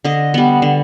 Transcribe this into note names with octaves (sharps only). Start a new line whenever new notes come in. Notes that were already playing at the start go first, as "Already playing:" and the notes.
D3 D#5
G3 B3
D3